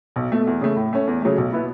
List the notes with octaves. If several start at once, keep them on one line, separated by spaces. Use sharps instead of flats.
B1
B2 A3
E2
C#3 A3
A2
A3 C#4
E2
C#3 F#3 A3
B1
B2 B3 E4